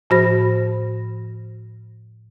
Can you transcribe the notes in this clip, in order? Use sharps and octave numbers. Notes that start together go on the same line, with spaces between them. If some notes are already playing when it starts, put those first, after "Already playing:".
A2 F3 F#4 C5 B5 A#6